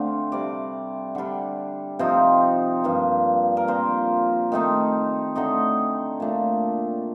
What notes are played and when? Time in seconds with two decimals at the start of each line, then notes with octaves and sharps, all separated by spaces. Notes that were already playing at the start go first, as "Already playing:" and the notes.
Already playing: D3 A3 C4 F5
0.32 C3 G3 D4 D5
1.15 D3 G3 D4
1.99 C3 F3 C4 D#4
2.84 G2 F3 A#3 D4
3.57 A#4
3.68 A#2 F3 C4 C5
4.52 D#3 A3 C4 D#4
5.36 D3 A3 C4 D#4 D#5
6.20 A#2 A3 D4